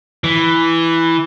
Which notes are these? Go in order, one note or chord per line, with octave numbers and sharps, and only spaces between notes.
E3